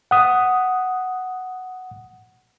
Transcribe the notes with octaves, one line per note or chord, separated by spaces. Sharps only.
F#5 D#6